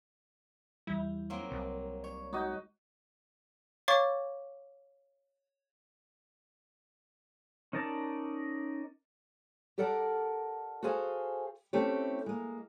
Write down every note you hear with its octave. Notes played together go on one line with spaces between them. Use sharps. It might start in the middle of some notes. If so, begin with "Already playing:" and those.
E2 E3 G3 E4
F#3 A#3 C4
C2 C3
C#5 D5
G#3 D#4 F#4 D#5 G6
C#5 F5 C#6 D6 A6
C#4 D#4 A#4 D5 A5
G4 A4 A#4 D5 F#5 A5
F#4 G#4 A4 C5 F5 G#5
A3 C4 C#4 E4 G4
G#3 A#3